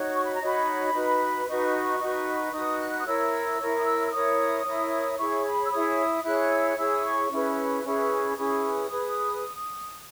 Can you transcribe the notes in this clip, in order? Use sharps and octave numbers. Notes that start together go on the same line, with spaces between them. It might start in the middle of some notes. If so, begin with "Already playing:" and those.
Already playing: D#4 F#4 C#5
C#6
B5
A#5
D#4 F#4 C#5 B5
D#4 F#4 B4
D#4 F#4 B4 C#6
D#4 F#4 B4
D#4 F#4 B4 D#6
F#6
D#6
E4 A#4 C#5 E6
E4 A#4 C#5
D#6
E6
E6
E4 A#4 C#5 D#6
E4 A#4 C#5
E4 G#4 C#5 C#6
B5
E6
E4 G#4 C#5 D#6
E4 G#4 C#5 F#6
E6
F#6
E4 G#4 C#5 E6
D#6
C#6
C#4 E4 G#4 B4
C#4 E4 G#4 B4
C#4 E4 G#4 B4 D#6
G#4 B4